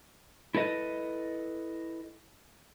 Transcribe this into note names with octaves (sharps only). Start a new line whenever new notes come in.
E4 A4 B4 D#5